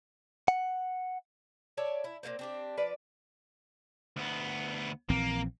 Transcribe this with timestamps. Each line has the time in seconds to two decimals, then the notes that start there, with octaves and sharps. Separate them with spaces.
0.48 F#5
1.77 C#5 D5 E5 A5
2.04 E4
2.23 A#2 C#3 A#3 C4
2.39 C4 D4 G4
2.77 F3 B4 D5
4.16 D2 B3
5.10 A#1 E3 A#3 C4